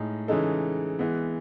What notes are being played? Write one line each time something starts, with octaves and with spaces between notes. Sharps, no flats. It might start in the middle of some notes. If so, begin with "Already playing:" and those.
Already playing: A2 G#3 D#4 G#4
C#3 E3 G#3 D#4 A4
E3 G#3 B3